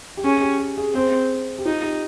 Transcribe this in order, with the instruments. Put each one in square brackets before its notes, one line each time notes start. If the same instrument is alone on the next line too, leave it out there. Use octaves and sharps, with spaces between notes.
[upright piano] G4
[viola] C#4 [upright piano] G#4
[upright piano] G4
G4
G#4
[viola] C4 [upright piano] G#4
[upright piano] G4
[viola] D#4 [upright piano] F4
[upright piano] G4